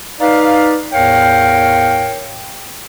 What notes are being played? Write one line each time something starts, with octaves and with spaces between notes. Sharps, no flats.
D#4 B4 D5 F5
E2 A2 A#4 C#5 F5 G5